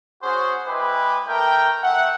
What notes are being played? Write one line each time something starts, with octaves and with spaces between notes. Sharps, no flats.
C#4 F#4 G#4 C5
G#3 E4 B4 G5 D6
A3 A#4 G5
A3 E5 F#5